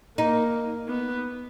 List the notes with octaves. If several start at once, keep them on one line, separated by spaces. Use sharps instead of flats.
A#3 D#4
B3